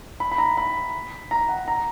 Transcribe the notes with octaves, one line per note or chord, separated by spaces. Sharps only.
B5
B5
A#5
B5
A#5
F#5
A#5